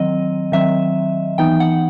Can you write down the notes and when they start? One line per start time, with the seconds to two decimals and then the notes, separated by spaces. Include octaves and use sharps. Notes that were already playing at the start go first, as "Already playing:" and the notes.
Already playing: D#3 F#3 C4 D#5
0.52 D#3 F#3 C4 E5
1.38 E3 B3 D#4 G5
1.60 F#5